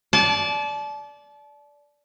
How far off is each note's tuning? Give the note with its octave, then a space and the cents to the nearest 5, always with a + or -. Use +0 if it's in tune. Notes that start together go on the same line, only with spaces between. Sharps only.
D5 -10 A5 -30